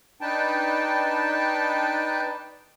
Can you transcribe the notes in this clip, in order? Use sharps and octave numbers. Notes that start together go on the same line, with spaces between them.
D4 D#4 B4 G5 A5